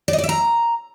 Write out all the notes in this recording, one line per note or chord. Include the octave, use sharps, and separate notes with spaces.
D5
D#5
D5
E5
A#5